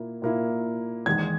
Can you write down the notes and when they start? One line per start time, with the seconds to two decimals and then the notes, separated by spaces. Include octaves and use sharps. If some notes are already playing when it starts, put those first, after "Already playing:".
Already playing: A#2 A#3 E4
0.22 A#2 A#3 E4
1.06 E2 D#3 G#3 G#6